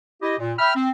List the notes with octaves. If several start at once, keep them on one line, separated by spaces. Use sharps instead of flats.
E4 G4 D#5
A#2
E5 G5 B5 F6
C4